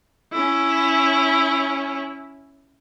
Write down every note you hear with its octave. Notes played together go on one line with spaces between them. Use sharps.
C#4 E4